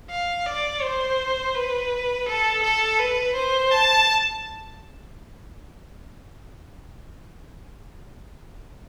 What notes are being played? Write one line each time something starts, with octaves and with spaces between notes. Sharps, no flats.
F5
D5
C5
B4
A4
A4
B4
C5
A5